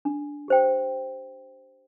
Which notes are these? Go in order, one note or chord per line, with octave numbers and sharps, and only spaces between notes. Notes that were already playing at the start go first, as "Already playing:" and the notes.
D4
G4 C5 G5